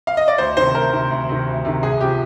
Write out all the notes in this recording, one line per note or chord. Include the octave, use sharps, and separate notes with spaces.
F5
D#5
D5
D2 C5
C3 D#3 C5
D2 A#4
C3 D#3
D2
C3 D#3
D2
C3 D#3
C2 G#4
C3 F3 G4